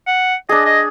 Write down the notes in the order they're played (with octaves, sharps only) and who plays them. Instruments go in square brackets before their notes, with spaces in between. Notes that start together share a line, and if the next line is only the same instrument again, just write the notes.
[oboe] F#5
[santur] D4 G#4 [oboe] D#5
[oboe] D#5